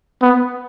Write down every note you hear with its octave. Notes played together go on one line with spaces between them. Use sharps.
B3